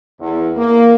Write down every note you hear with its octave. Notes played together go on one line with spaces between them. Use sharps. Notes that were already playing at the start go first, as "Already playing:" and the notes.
E2
A#3